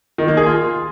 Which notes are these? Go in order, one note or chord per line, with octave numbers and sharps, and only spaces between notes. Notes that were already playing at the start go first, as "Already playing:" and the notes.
D#3
A#3
G#4
F4